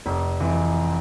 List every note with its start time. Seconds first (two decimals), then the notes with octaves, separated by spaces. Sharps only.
0.06 F1
0.40 F2 E3